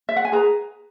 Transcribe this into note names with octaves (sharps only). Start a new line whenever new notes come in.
E5
F#5
G#5
G#4 B4 A#5